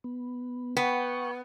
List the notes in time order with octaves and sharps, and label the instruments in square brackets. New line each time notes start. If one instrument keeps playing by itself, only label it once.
[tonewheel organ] B3
[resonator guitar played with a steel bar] B3 [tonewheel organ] F#5 G5 C#6